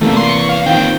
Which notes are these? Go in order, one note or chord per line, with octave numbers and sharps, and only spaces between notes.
E2 C3 E3 A3 A#3
C6
C#6
F5
D#3 A#3 C4 F4 G5